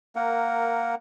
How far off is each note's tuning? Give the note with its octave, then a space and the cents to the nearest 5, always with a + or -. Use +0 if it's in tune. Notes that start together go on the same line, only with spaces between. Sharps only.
A#3 -10 A#4 +0 F#5 +0